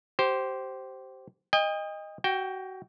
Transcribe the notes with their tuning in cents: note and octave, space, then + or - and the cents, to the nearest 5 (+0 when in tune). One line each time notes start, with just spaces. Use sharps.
G4 -25 C5 +0
D#5 +0 G5 +40
F#4 +25 G5 +0